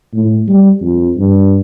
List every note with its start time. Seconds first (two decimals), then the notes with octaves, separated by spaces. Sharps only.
0.14 A2
0.48 G3
0.81 F2
1.17 G2